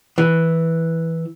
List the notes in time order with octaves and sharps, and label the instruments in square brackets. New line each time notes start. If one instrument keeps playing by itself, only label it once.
[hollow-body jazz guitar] E3